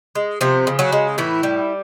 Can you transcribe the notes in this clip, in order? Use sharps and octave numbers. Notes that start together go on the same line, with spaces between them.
G#3
C3 F3 C4
C#3
F#3 F#4
G#3
A2 E3 E4
G3